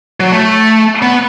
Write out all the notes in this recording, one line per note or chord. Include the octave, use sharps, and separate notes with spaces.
F#3
A3
B3